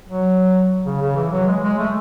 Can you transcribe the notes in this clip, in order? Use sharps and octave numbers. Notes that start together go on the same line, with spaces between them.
F#3
C#3
C#3
E3
F#3
G#3
G#3
A3